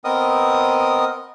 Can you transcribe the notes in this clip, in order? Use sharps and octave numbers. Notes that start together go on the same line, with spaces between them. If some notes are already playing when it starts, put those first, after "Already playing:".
B3 C4 A#4 D#5 D#6